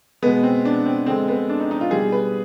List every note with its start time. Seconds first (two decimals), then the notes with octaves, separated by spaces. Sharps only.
0.22 B2 G#3 B3
0.43 C4
0.65 D4
0.86 C4
1.06 D3 G#3 C4
1.28 B3
1.49 D4
1.60 D#4
1.71 D#4
1.81 F4
1.91 B2 G3 G#4
2.12 B4